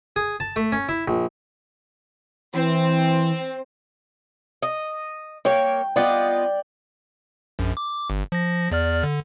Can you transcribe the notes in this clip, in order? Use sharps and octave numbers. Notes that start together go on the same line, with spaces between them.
G#4
A5
A3
C#4
E4
A#1
E3 C4
D#5
A#3 C#5 G5
B3 F4 D5 D#5 G5
A#1 F#2
D6
G1
F3 A#6
E2 D5 F6
D3